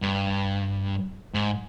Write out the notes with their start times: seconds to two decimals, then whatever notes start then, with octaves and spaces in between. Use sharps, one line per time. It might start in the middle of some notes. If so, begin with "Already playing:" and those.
0.02 G2
1.34 G#2